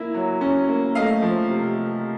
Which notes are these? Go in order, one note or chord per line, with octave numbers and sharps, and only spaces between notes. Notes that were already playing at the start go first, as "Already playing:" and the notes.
Already playing: A#3 E4
F#3
C#4
A#3
A3 D#5 F5
F3
C3
C3